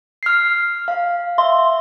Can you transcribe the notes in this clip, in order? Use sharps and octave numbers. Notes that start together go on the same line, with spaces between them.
F6 C7
F5
E5 C6